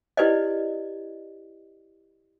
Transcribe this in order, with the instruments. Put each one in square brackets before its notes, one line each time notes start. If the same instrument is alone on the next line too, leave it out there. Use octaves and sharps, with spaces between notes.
[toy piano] E4 G4 B4 D5 D#5